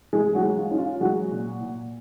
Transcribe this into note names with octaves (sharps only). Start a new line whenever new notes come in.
G#3 G#4
F#3 F#4
G#3
F4
C#4 D#4
F4
F#3 G#3 F#4
A#2
A#2